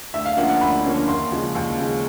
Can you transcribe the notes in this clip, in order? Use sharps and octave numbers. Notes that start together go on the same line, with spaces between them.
D2 E5
F5
D3 F3 A#3 C#4 F#5
F#5
D2 B5
D3 F3 A#3 C#4
D#2 C6
C#3 F3 G#3
D#2
C#3 F3 G#3